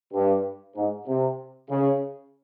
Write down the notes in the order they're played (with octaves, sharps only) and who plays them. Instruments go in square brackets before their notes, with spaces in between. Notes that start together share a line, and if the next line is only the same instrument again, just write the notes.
[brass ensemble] G2
G#2
C3
C#3